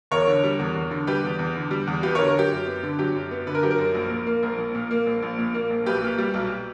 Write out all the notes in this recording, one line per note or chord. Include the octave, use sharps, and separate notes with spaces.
E2 A#4 C#5
D3
G3
E2
E2
D3
G3 G4 B4
E2
E2
D3
G3
E2
B3 G4 B4
D3 A#4 C#5
A#4
F#3 G4
F#2
B3
D3
F#3 G4
F#2
B3
D3 B4
A#4
F#3 G4
A#4
F#2
A#1
A#2
A#3
A#1 A#4
A#1
A#2
A#3
A#1
A#1
A#2
A#3
A#1
B1 G4 B4
A#2
G3
B1